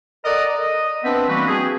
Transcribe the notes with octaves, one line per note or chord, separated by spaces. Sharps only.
A4 A#4 D5 D#5 F#5 A#5
D#5
B3 C4 D4 B4 C5 E5
E3 G3 A#3 F#4 B4
F3 C4 F#4 G#4